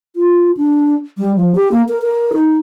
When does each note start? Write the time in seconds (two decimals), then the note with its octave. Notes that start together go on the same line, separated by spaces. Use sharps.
0.16 F4
0.57 D4
1.18 G3
1.36 F3
1.55 G4
1.72 A#3
1.89 A#4
2.02 A#4
2.33 D#4